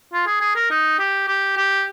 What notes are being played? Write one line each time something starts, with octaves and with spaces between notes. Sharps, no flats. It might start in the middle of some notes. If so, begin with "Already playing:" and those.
F4
G#4
G#4
A#4
D#4
G4
G4
G4